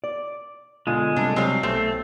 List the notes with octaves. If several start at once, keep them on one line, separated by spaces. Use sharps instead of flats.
D5
B2 D3 G#3 F4
C3 G3 A3 D4
C3 F#3 G3 C4 F5
B1 A3 C4